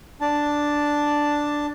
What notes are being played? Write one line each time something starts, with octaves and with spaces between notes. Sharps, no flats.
D4 A5